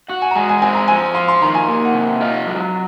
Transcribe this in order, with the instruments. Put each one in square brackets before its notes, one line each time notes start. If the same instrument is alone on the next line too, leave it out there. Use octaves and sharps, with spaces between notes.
[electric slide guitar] F#4 [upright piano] F#5
[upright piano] G#5
A#5
[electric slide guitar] G#3 [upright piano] G#5
[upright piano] G#5
[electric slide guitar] C4 [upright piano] G#5
[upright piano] A#5
[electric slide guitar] F3 [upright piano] G#5
[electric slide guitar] F4 [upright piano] C6
[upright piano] C6
[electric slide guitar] D#3 [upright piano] A#5
[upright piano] G#5
[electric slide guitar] A#3
[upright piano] F#5
[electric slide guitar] C3
[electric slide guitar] F4 [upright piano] D#5
[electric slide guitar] F#3